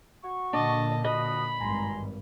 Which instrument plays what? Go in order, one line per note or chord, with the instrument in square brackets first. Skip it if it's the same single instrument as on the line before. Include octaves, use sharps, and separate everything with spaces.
[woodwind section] F#4 C#6
[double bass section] A#2 D3 [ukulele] D4 [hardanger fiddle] D#5 A5
[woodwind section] F2 F#4 D#6 [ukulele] D#5 [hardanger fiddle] B5
[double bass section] G#1 G2 [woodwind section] G#5 A#5 C6